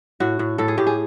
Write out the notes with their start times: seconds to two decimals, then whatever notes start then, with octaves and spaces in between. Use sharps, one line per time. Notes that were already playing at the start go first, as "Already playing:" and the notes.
0.20 A2 F#4
0.39 A2
0.58 A2 A4
0.68 G#4
0.78 A2 G4
0.87 G#4